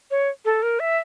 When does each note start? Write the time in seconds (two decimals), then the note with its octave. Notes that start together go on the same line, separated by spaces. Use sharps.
0.11 C#5
0.45 A4
0.63 A#4
0.80 E5